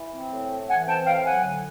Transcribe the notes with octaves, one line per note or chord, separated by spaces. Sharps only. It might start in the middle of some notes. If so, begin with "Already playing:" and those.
Already playing: E3
C4
A2
A3
E3 F#5 G#5
C4 G5 A5
A2 F5 G5
F#3 F#5 G#5
D3